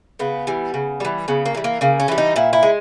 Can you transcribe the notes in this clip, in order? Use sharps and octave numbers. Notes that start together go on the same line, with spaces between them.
C#3 B3
E3 G3
C#3
E3 G3
C#3 B3
A#3
E3 G3
A#3
C#3 A#3
C#4
E3 G3
D#4
A#2 E4
E4
G#3